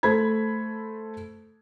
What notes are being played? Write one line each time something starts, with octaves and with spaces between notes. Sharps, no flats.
A3 A4 C5 B5 G#6